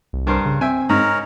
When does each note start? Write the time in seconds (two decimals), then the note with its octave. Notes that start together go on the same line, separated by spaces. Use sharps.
0.13 C2
0.27 G2 A#4 C5
0.45 C#3
0.61 C4 E5 G5 G#5
0.89 G#2 A#4 C#5 A#5